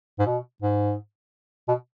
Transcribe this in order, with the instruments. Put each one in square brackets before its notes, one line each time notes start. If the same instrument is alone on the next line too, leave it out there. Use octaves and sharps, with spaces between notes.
[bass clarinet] G#2
B2
G#2
B2